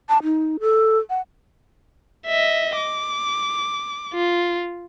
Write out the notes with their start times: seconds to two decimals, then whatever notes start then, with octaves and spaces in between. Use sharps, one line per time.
0.09 A5
0.24 D#4
0.61 A4
1.10 F#5
2.27 D#5 E5
2.77 D6
4.14 F4